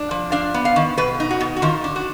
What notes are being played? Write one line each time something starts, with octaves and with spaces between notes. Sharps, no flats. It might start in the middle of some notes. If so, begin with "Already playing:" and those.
Already playing: D4
F3
D4 F5
B3
F5
D#3
B2 B4
D#4
F#4
B2
F#4
D#3 F4
D4
F#4